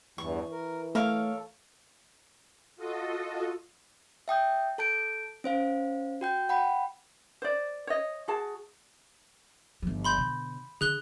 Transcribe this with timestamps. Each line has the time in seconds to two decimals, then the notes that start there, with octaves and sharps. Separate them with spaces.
0.18 E2 G2 E3 C#6
0.52 A#4
0.95 A3 A4 A#4 C#5 F5
2.76 F4 F#4 A4 D#5
4.28 E5 G5 D#6 G6
4.78 A4 A5 G6 D7
5.44 C#4 C5 F5
6.21 F#4 G5 G6
6.49 F#5 G5 B5
7.42 C5 D5
7.87 C#5 D#5
8.28 F#4 G#4 A5
9.82 G1 F3
10.04 B5 C6 G6
10.18 B2 D3
10.81 D3 G#4 F#6 G7